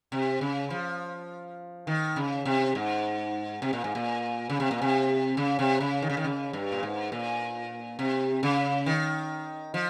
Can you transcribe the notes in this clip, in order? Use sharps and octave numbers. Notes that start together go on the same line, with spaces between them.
C3
C#3
F3
D#3
C#3
C3
G#2
C3
A#2
G#2
A#2
C#3
C3
A#2
C3
C#3
C3
C#3
D#3
C#3
D#3
C#3
G2
A#2
G#2
A#2
C3
C#3
D#3
F3